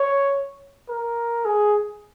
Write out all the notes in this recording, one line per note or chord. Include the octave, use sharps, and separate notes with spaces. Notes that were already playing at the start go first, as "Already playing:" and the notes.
Already playing: C#5
A#4
G#4